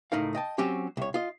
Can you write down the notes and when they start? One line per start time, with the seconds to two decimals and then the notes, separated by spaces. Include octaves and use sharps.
0.12 C#2 A2 D#4 A#4 F5
0.35 D#5 G5 A5
0.58 F#3 C4 C#4 G4
0.97 C2 C#5
1.14 F4 D#5